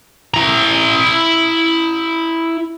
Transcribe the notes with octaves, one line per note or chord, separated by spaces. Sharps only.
E4 A#5